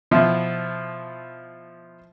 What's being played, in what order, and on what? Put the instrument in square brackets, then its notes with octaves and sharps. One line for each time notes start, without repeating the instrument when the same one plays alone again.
[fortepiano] B2 F3 E4